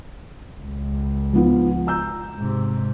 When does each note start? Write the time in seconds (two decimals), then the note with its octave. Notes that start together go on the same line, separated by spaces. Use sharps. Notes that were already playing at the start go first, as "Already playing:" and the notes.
0.61 C#2
1.33 F3 B3 F4
1.87 A#5 E6 G6
2.36 G#2 C3